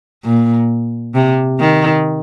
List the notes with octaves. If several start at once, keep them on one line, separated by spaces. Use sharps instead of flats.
A#2
C3
D#3